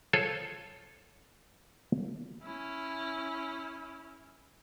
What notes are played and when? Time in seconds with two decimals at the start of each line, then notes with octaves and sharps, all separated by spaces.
0.13 F4 G#4 A4 C5 C#5
2.43 C#4 E4